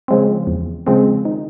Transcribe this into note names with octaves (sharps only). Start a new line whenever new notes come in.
C#3 F3 G#3 C4
E2
C#3 F3 G#3 C4
D#3